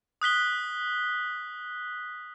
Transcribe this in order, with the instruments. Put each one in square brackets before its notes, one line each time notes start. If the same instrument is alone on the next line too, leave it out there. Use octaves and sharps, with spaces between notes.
[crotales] D#6 F#6 B6 G7